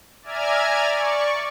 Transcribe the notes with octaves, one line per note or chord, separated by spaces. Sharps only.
D5 E5 G#5 A#5 F6 G#6
D5 C#6